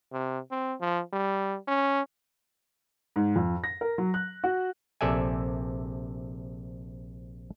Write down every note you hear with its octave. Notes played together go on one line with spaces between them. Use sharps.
C3
C4
F3
G3
C#4
G#2
F2
A#6
A#4
F#3
F#6
F#4
A#1 C3 A4 D5 E5 G#5